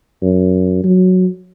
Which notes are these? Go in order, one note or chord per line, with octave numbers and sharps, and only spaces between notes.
F#2
F#3